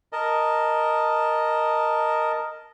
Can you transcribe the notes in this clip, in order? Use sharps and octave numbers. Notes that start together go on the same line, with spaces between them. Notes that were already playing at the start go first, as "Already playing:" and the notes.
A#4 D#5 A5